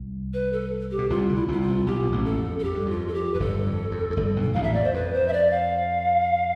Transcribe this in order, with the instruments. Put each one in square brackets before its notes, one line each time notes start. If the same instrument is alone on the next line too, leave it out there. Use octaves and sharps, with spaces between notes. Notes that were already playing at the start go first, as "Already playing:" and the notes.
Already playing: [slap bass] C2
[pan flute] B4
A4
G4
[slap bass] B2
[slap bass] C2 C3 [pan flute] F4
[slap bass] D2 D3
[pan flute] E4
[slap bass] C2 C3 [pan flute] E4
[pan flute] F4
[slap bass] C2 C3
[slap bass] B1 B2 [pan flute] G4
[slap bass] B2
A1 A2
[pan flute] A4
[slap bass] F2
[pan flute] A4
[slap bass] F2 [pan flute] G4
[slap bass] G2
[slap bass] F2 [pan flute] F4
[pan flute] A4
G4
[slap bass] F2 [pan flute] B4
[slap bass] G1 G2 [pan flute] A4
[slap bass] F2
F2
F2
G1 G2
B1 B2
[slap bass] A1 A2 [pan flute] F5
[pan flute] E5
[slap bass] F2 [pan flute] D5
[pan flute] C5
[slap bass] F2 [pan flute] B4
[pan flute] C5
E5
D5
F5